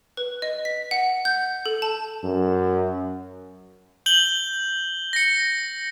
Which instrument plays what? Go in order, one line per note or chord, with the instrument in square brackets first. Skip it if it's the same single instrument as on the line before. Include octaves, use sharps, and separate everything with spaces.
[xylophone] B4
D#5
B6
F#5
G6
A4
A5
[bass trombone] F#2
[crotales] G6 F#7 G7
A#6 C#7